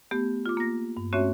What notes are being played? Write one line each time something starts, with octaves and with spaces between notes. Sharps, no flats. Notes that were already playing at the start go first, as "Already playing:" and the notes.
A3 B3 G4
F4 D6
A#3 A#6
G2
A3 C4 C#4 F#4 C#5 E5